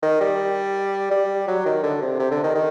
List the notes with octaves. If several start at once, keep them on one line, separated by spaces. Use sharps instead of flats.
D#3
G3
G3
F#3
D#3
D3
C3
C3
D3
D#3
D#3